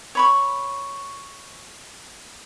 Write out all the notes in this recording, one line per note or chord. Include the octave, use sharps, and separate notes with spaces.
C#5 B5 C#6